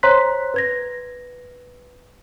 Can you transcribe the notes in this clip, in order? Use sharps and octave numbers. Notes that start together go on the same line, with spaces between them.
C5 C#5 A#5 C6 F#6 B6
B4 G#6 A#6